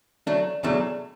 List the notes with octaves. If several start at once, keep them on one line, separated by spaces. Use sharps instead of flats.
F#3 A3 D4
E2 B2 F#3 A3 D4